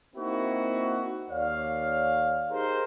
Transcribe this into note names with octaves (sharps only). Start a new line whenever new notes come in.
A#3 C4 D#4 E4 F#4
D#2 C#5 D5 F5
D#4 G4 G#4 A#4 C5